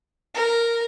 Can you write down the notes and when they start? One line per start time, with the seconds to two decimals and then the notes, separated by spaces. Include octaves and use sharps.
0.34 A#4